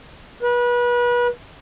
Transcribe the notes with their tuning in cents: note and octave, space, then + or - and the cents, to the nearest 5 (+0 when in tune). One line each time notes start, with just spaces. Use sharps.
B4 -30